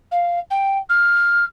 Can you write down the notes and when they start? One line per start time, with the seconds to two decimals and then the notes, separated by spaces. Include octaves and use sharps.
0.11 F5
0.50 G5
0.89 F6